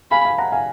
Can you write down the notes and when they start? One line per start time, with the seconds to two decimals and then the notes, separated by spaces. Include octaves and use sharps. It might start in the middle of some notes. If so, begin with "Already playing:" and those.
0.11 F5 G#5 B5
0.25 F5 G#5
0.38 F#5 A#5
0.52 F5 G#5